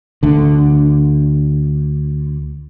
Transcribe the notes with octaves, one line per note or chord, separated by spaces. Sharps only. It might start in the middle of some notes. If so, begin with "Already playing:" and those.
D2 D3